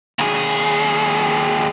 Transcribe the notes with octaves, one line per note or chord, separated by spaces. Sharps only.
D#2 G#4